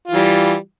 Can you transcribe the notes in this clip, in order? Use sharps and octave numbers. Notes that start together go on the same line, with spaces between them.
E3 G3 F4